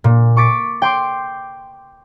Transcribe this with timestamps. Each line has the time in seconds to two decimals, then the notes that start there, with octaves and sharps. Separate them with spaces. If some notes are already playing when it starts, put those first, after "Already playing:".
0.04 A#2
0.37 C#6 D6 A6 B6
0.82 G5 C6 D6